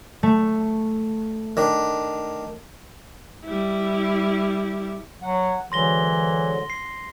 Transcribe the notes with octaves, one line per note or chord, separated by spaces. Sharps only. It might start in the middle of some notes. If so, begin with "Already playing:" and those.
A3
D#3 D4
G3 E4
F#3 F#5
G#2 D3 E3 F#3 C6 A#6 G7
C7